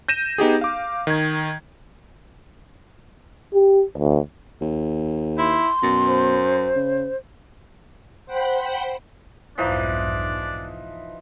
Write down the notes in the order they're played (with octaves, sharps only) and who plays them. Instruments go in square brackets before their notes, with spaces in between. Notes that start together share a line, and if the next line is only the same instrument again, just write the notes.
[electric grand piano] G6 A#6 D#7 E7
B3 D#4 G4 G#4
F5 D6
D#3 G#6
[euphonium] G4
D2
[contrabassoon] D#2
[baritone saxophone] E4 [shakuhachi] C6
[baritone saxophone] F#2 [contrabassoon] B2
[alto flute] C5
[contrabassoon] C#3
[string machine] C5 F#5 G5 B5
[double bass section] B1 F2 G#2 [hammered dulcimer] E3 F3 D#4 [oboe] D4